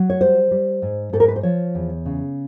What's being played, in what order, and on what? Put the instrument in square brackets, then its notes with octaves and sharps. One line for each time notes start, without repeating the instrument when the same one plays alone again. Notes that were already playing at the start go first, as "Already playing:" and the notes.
Already playing: [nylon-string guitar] F#3
C#5
G3 C5
G3
G#2
G#2 A4
A#4
B4
C5
F3 C#5
E2
C#3